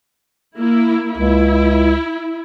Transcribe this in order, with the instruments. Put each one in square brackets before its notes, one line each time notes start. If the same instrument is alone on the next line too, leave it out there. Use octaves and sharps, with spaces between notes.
[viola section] A#3 E4
[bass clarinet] C#2 [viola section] E4